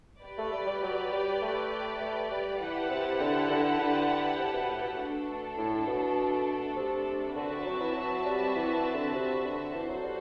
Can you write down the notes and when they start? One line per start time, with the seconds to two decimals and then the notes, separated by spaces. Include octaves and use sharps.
0.22 G4 B4 D5
0.38 A3
0.53 G3
0.67 G3
0.83 F#3
1.12 G3
1.42 A3
2.01 A3
2.31 G3
2.60 E3 E4 G4 B4 F#5 A5
2.90 C3
3.20 D3
3.50 D3
3.80 D3
4.38 C3
4.54 B2
4.69 A2
4.83 B2
4.99 A3 D4 A4
5.57 A2
5.87 B2
6.76 C3
7.35 D3 C4 F#4 B4 E5 A5
7.52 D3
7.65 F#3
7.81 E3
7.95 F#3
8.25 G3
8.56 E3
8.74 E3
8.94 D3
9.14 C3
9.44 D3
9.73 E3 F#4 A4 C5
9.89 F#3
10.03 G3